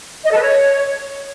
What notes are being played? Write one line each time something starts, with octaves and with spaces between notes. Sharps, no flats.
D#5
A4
B4
C#5